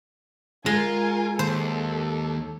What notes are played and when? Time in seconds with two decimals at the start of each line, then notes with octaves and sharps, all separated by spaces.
0.66 G#3 F4 A#4 G#5
1.39 D#2 A4 C5